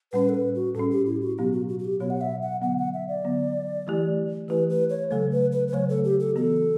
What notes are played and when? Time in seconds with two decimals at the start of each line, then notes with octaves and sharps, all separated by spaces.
0.12 A2 G3 C#4 B4
0.29 A4
0.34 B4
0.55 F#4
0.75 A2 G3 C#4 A4
0.91 G4
1.06 E4
1.22 F#4
1.38 B2 F#3 B3 G4
1.52 F#4
1.68 F#4
1.79 F#4
1.85 G4
2.00 B2 F#3 B3 C#5
2.10 F#5
2.21 E5
2.42 F#5
2.62 D3 F#3 B3 F#5
2.78 F#5
2.94 E5
3.08 D5
3.24 D3 F#3 B3
3.87 E3 A3 E4 G4
4.48 E3 A3 E4 G4 B4
4.70 B4
4.90 C#5
5.11 C#3 F#3 A3 A4
5.32 B4
5.52 B4
5.68 B4
5.73 C#3 F#3 A3 C#5
5.89 A4
6.04 G4
6.20 A4
6.36 E3 B3 F#4 A4